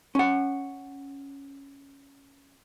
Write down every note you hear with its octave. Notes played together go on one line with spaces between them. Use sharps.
C#4 F#5